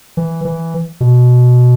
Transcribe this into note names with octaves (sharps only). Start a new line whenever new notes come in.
E3
E3
B2